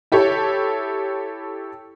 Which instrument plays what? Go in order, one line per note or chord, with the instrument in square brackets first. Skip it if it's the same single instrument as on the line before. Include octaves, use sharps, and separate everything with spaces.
[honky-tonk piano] E4 G4 A4 C#5